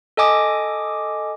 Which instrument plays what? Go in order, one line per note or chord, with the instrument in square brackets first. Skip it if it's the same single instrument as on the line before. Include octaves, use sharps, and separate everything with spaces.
[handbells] A4 D#5 G#5 D6 D#6